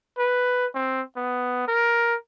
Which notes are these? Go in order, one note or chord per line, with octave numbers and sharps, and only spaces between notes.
B4
C4
B3
A#4